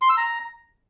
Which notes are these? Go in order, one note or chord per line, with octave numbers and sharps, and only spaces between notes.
C6
E6
A#5